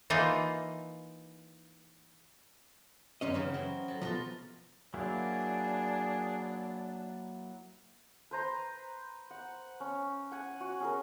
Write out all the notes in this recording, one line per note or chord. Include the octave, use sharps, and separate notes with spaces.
E3 A#3 D#4 F4
F#2 D3 C#4 D#4 D#5 F5
C#3 E3 G3 C#4
F#3 C4 E4
F#3 A4
B2 F3 F4 A4 A#5
F#3 A#3 D4 E4 G#4
B4 C5 A#5
F#5
C#4
F#5 G#5
F#4
C#4 G#4 A#4